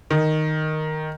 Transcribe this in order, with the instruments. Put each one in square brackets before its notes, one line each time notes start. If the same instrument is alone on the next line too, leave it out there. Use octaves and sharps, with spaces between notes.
[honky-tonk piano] D#3